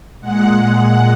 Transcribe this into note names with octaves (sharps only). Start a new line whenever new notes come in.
A#2 G#3 F#5
F#5